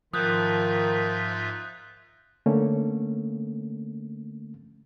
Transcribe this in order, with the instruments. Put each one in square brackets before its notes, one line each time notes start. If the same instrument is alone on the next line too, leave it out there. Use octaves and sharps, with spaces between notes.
[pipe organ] G#2 F4 E5 [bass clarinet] D#3 [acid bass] F3 [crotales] D#6 F#6 G6
[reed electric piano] D3 A3 A#3 C#4